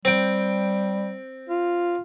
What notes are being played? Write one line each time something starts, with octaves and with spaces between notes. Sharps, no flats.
G3 C4 G5
F4